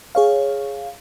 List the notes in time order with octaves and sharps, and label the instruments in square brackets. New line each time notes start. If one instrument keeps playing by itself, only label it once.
[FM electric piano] G#4 C#5 F5